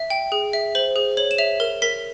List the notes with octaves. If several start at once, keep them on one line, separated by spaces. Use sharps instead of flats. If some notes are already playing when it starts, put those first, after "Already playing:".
Already playing: E5
G5
G#4
E5
C5 F#7
G#4
C#5 F#7
E7
E5 F7
A#4
A#4 B6